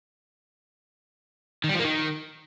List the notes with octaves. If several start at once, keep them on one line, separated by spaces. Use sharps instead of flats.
D#3
G3
F3
A#3
D#3